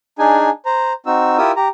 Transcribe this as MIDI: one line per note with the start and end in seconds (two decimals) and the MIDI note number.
0.19 0.50 62
0.19 0.50 63
0.19 0.50 68
0.19 0.50 80
0.66 0.93 72
0.66 0.93 82
1.06 1.38 60
1.06 1.38 63
1.06 1.38 66
1.06 1.38 88
1.38 1.52 64
1.38 1.52 65
1.38 1.52 67
1.38 1.52 70
1.38 1.52 87
1.38 1.52 88
1.56 1.68 67
1.56 1.68 82